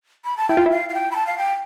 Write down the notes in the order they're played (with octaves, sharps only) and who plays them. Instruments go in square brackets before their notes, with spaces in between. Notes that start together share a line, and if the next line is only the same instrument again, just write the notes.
[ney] B5
A5
[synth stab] E4 [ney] G5
[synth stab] F4
E4
[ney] F5
F5
G5
B5
A5
F5
G5